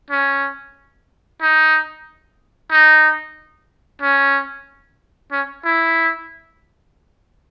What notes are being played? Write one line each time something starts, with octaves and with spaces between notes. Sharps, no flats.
C#4
D#4
D#4
C#4
C#4
E4